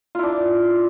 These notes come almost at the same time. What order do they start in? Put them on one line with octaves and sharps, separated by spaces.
F4 E4 D4